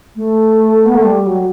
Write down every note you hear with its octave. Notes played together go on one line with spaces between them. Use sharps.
A3
B3
A3
G3
F#3